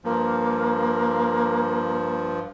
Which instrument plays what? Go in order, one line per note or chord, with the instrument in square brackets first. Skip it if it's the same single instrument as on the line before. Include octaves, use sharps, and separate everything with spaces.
[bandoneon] G2 F3 [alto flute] A#3